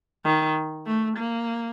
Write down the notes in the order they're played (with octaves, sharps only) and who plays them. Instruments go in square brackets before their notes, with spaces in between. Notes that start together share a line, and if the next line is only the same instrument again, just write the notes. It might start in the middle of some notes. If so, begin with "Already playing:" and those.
[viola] D#3
A3
A#3